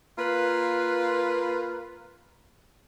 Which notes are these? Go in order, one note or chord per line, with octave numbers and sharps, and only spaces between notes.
A#3 F4 B4